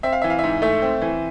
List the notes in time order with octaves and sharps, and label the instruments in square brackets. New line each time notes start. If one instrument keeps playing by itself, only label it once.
[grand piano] C4 E5
F5
E3 E5
F5
G#2 E5
A3 E5
C4
E3